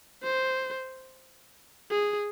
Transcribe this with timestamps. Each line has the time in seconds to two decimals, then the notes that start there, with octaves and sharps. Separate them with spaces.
0.23 C5
1.91 G#4